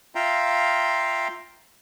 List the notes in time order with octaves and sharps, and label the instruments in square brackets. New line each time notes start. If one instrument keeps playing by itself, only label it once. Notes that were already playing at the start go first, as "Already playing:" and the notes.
[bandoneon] F4 E5 F5 G5 A#5